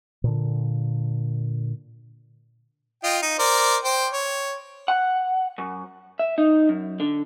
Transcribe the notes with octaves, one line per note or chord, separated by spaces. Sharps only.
A#2 D3
F4 D#5 G5
D#4
A#4 C5 D5
C5 G5
C#5
F#5
F#2
E5
D#4
F#2
D3